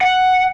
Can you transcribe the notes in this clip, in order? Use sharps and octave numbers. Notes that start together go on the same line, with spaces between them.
F#5